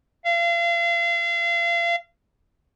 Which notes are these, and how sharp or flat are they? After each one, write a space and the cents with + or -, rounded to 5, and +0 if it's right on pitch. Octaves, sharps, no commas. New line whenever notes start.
F5 -35